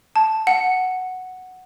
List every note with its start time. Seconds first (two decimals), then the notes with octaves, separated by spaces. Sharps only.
0.16 A5
0.47 F#5